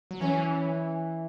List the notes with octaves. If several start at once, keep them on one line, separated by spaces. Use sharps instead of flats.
F#3
E3 C#4